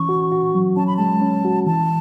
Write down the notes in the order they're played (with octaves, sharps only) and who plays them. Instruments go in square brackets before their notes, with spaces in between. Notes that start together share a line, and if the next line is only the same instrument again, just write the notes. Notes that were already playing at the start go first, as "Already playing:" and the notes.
Already playing: [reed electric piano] E3 C#4 [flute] C#6
[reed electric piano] F#4
F#4
F#3
[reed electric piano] C#4 [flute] A5
[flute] B5
[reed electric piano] G#3 [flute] A5
[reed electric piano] C#4
F#4
[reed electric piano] E3 [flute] A5